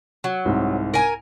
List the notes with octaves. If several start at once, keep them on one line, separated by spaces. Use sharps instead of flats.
F#3
C2 G#2
A#4 G#5